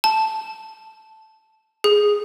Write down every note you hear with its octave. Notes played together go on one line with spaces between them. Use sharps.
A5
G#4